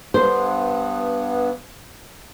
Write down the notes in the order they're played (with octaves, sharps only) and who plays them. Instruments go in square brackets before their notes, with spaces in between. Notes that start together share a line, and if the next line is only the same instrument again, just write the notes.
[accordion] G2 B3 [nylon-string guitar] C5